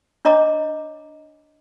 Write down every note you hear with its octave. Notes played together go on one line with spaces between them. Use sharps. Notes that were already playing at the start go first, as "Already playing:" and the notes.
D4 C#5 D#5 A#5 D6